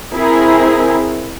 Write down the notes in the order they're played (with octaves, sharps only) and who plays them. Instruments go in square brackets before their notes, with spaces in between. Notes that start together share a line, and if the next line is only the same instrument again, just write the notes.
[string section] C4 E4 G#4 A#4